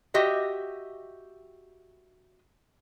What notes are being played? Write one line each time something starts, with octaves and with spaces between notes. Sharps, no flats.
F#4 G4 D#5 E5